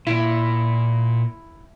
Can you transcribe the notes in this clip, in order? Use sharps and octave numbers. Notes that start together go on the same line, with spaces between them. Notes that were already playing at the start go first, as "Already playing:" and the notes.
A#2 E4